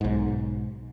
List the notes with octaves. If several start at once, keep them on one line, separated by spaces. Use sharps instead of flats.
B1 G#2